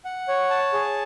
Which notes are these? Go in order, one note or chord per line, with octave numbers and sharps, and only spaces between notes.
F#5
C#5
A5
G#4